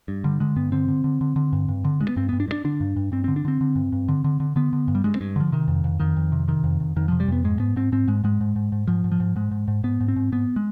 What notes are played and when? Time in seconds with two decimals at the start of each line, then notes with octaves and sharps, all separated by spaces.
0.08 G2
0.24 D3 G3
0.40 D3 G#3
0.56 G2 B3
0.72 D3 C4
0.88 D3
1.04 D3
1.21 D3
1.36 D3
1.53 G2
1.68 G2
1.85 D3
2.01 G2 G#3
2.08 B3
2.16 G2 C4
2.29 G2 B3
2.40 D4
2.48 G2
2.52 D4
2.64 D3 D4
2.80 G2
2.96 G2
3.12 G2 C4
3.24 D3 C4
3.36 D4
3.45 D3 C4
3.61 D3
3.76 G2
3.92 G2
4.08 D3
4.24 D3
4.40 D3
4.56 D3 B3
4.73 D3
4.88 G2
4.95 G3
5.04 G2 G#3
5.16 C4
5.21 G2
5.36 D3 F3
5.52 C3 D#3
5.68 F2
5.84 F2
6.00 F2 D#3
6.17 F2
6.32 C3
6.48 C3 D#3
6.64 F2
6.80 F2
6.96 F2 D#3
7.08 C3 F3
7.20 G3
7.28 F2 B3
7.44 G#2 G#3
7.59 G#2 B3
7.76 G#2 C4
7.92 G#2 C4
8.08 G#2 G#3
8.24 G#2 G#3
8.41 G#2
8.56 G#2
8.72 G#2
8.87 G#2 F3
9.04 G#2
9.12 F3
9.20 G#2
9.36 G#2 G#3
9.51 G#2
9.68 G#2
9.84 G#2 B3
10.01 G#2
10.08 C4
10.16 G#2
10.32 G#2 B3
10.56 G#3